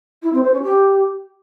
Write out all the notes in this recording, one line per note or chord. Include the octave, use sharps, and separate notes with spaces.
E4
C4
C5
C#4
G4